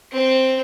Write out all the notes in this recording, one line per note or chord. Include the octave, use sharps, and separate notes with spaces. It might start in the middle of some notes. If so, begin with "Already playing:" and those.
C4